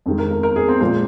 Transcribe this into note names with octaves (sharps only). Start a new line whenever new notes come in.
F2 D#3 G#3
A#4
A#4
A#4
G#4
C4
A#2 F3 G#3 C4